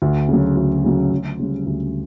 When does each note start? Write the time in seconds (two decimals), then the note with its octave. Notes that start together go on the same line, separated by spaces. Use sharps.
0.02 D2
0.29 C#3 F#3
0.56 D2
0.84 C#3 F#3
1.12 D2
1.39 C#3 G3
1.66 D2